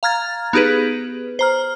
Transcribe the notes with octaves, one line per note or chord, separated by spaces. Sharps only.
F5 A#5 F6 G#6 A6
B3 D#4 G4 G#4 B4
C5 A#5 F6